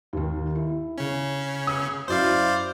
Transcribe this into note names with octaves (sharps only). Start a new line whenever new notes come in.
D#2 D#3
E4
C#3 C#4
D#6
F#2 E4 C5 D5 F5